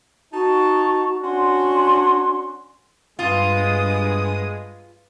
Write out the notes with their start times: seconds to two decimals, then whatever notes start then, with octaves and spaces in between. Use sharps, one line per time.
0.32 D#4 F#4 A5
1.22 C#4 D4 F#4 C6
3.19 G2 G#3 B3 F4 D#6